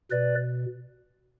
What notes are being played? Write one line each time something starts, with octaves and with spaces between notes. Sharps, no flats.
B2 B4 D5